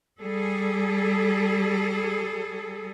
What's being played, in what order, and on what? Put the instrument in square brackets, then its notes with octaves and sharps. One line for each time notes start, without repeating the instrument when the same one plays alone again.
[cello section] G3 G#4 A4